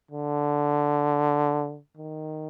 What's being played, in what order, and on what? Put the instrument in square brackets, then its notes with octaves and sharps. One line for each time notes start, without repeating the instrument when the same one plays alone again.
[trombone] D3
D#3